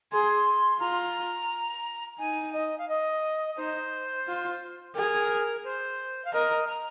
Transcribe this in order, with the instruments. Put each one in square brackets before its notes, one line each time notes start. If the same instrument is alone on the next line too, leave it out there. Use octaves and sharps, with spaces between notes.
[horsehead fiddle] G#4 [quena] C6
[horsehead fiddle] F4 [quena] A#5
[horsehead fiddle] D#4 [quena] G#5
[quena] D#5
F5
D#5
[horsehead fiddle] D#4 [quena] C5
[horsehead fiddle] F4
[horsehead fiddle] G#4 [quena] A#4
[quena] C5
F5
[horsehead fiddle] A#4 [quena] D#5
[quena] A#5